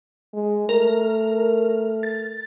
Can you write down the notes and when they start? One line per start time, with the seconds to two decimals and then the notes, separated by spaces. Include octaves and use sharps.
0.33 G#3
0.69 A3 A#4
2.03 A6